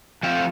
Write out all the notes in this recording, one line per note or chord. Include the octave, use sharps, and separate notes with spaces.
F3 A3 C4 F4 G5